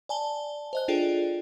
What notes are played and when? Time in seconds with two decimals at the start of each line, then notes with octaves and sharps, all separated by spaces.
0.09 D5 G#5 A5 G7
0.73 C5 D#5 F#6
0.88 D4 F4 G#4 A4 D5 G5